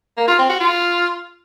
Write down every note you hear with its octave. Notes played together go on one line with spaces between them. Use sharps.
A#3
F4
C4
F#4
F4